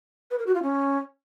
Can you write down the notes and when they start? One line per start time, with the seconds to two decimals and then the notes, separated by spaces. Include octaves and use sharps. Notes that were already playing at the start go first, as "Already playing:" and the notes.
0.31 B4
0.39 A#4
0.47 F#4
0.55 F4
0.63 C#4